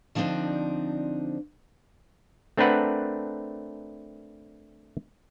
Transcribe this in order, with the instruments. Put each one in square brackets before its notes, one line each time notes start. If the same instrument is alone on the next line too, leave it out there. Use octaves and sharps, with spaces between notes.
[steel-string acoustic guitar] D3 F3 G3 C4 D4 D#4
[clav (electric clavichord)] A3 C4 D4 A#4 B4 F#5